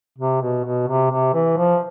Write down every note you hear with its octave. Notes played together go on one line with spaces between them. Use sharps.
C3
B2
B2
C3
C3
E3
F3